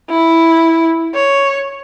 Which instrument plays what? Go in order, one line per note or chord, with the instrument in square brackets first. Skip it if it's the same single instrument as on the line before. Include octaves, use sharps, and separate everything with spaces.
[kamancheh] E4
C#5